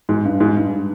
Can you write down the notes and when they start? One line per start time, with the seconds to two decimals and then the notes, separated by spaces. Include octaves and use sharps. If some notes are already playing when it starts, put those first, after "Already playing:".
0.09 G#2
0.25 G2
0.40 G#2
0.57 G2